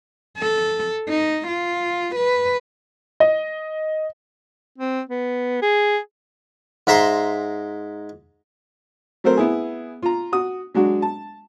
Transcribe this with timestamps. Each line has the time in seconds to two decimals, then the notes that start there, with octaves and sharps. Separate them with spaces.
0.38 A4
1.09 D#4
1.48 F4
2.16 B4
3.20 D#5
4.78 C4
5.09 B3
5.62 G#4
6.87 G#2 E5 A#5 C6
9.24 F#3 A3 C4 A#4 C5
9.37 B3 E4 G#4
10.03 F4 A#5
10.32 F#4 D#6
10.74 F#3 G#3 D4 F#4
11.02 A5